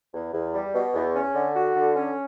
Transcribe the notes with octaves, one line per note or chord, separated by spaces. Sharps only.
E2
E2
G3
B2
E2
C#4
D3
F#4
D3
C#4